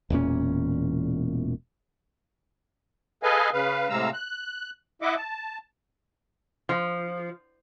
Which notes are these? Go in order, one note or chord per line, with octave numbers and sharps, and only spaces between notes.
E1 E2 A#2 C#4
G#4 A4 B4 D#5 F5 G#5
C#3 B4 F5
A2 C3 G#3 F5 A#5 E6
F#6
E4 D#5 E5 F#5 D6
A5
F3